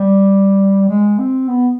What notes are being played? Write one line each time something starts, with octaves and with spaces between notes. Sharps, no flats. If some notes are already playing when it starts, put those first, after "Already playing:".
Already playing: G3
G#3
C4
B3